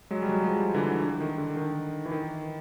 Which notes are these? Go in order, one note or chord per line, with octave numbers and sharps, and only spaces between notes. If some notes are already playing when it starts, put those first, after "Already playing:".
F#3 G#3
G3
F#3 G#3
G#3
F3 G3
D3 E3
D3
D#3
D3
D#3
E3
D#3